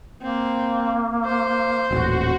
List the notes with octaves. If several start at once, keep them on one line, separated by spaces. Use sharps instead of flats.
A#3 C4
C5
D#1 A1 F#4